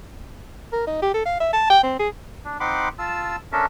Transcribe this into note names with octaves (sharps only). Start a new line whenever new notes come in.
A#4
D#4
G4
A4
F5
E5
A5
G5
C4
G#4
D4
C4 D#4 F#5 B5 C6 D6
F4 A5 E6
C#4 D4 A4 A#4 E5